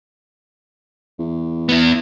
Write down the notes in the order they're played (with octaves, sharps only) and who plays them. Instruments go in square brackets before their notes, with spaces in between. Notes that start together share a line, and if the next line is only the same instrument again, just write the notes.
[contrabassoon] E2
[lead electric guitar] B3 E4